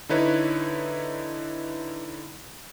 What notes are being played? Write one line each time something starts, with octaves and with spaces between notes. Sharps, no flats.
D3 D#4 E4 B4 C#5